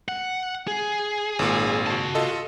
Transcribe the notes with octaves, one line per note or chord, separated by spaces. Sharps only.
F#5
G#4
G#1 A#2
F#4 A5
F4 A4 D#5